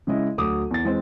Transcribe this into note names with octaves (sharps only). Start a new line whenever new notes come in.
C#3 G#3 E4 D#5
D2 F#3 D6 D#6
E2 A6
E3 G#3 C4